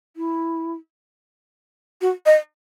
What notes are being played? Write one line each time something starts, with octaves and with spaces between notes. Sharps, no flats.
E4
F#4
D#5